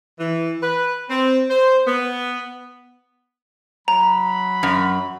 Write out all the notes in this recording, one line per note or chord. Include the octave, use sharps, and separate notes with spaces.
E3
B4
C4
C5
B3
F#3 A#5 B5
F#2